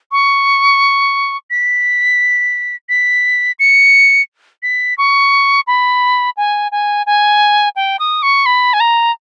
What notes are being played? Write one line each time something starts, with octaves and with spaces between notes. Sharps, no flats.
C#6
B6
B6
C#7
B6
C#6
B5
G#5
G#5
G#5
G5
D#6
C#6
B5
G#5
A#5